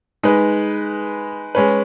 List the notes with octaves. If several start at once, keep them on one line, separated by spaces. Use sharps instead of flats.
G#3 D#4 B4
G#3 C#4 B4